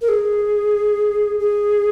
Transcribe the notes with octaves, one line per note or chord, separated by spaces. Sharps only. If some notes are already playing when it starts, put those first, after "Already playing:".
A#4
G#4
G#4